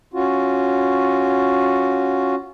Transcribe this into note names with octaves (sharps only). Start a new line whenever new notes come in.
C#4 F4 F#4